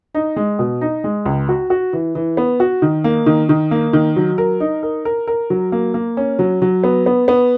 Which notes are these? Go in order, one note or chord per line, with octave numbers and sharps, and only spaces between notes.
D#4
G#3
B2
D#4
G#3
C#2
F#4
F#4
E3
E3
B3
F#4
D#3
A#3
D#3
D#3
A#3
D#3
F#3
A#4
D#4
A#4
A#4
A#4
F#3
A#3
A#3
C#4
F#3
F#3
B3
B3
B3